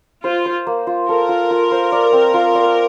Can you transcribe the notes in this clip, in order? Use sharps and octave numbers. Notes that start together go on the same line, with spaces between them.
F4 C5
C5
A#3
F4
A4 A#4
F4
F4
C5
D5
C4
F4
D5